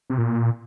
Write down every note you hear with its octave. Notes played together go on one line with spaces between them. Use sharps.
C3
A#2